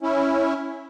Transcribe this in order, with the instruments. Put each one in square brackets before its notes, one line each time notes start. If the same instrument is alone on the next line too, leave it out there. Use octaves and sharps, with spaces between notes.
[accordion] C#4 E4